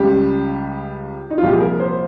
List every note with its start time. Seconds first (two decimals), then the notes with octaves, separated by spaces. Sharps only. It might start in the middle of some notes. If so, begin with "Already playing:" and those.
Already playing: C#2 C#3 G3 G4
1.30 D#4
1.38 F4
1.42 C2 A#2 F3 G4
1.53 G#4
1.60 A#4
1.80 C5